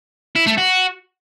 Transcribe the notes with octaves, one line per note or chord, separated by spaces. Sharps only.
E4
A3
F#4